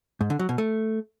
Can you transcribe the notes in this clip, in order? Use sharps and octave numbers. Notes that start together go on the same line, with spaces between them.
G#2
D3
F#3
B2
A3